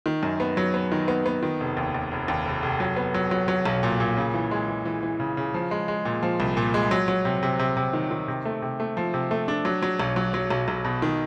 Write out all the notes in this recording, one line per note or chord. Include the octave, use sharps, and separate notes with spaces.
D#3
F#2
B3
F#3
B3
D#3
B3
B3
D#3
F1
D#2
D#2
F1
D#2
F1
F1
F#3
B3
F#3
F#3
F#3
B1
A#2
A#2
C#3
E3
G#3
E3
E3
E3
C#3
C#3
F3
G#3
G#3
A#2
F3
C2
A#2
G#3
F#3
F#3
C3
C3
C3
C3
D#3
D#3
C3
A3
C3
A3
F3
C3
A3
D4
F#3
F#3
B1
F#3
F#3
B1
B1
B2
D#3